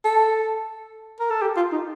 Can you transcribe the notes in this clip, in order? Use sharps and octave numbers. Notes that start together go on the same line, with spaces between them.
A4
A#4
A4
G4
F4
D#4